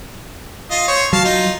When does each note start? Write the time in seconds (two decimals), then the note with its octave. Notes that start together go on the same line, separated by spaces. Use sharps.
0.71 F4 D#5
0.88 C5 C#5
1.13 F#3 F5 A5
1.25 D#4 F4